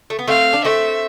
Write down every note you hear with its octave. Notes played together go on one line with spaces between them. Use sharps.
A3
B3
A3 C4 F5
D4
A3 C4 E5